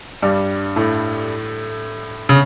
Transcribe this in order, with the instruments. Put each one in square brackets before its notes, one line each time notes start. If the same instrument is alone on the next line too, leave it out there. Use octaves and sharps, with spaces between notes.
[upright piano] G2 G3
A2 A3
C#3